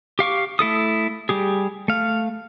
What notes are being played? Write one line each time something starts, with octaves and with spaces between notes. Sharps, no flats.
G4 F5 C#6 D6
A3 E4 A4 D#6
G3 G4 G#4
A3 F5